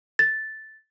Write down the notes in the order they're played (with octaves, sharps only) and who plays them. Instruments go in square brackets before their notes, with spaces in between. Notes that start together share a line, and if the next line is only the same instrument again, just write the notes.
[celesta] A6